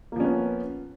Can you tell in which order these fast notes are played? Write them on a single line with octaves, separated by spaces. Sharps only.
A#3 F3 C#4 B3